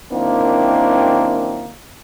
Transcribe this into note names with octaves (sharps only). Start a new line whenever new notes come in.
F#2 D#3 A#3 C4 D4 E4